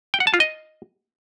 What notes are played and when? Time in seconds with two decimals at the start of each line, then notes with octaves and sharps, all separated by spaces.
0.14 G5
0.20 F#5
0.27 A5
0.34 F4
0.40 D#5